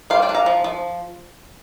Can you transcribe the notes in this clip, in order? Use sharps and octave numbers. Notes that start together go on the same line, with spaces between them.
G3 C5 F5
D5 G5
D4
F5 A#5
F3
F3